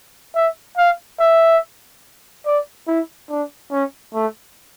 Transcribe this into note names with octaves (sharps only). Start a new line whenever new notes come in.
E5
F5
E5
D5
E4
D4
C#4
A3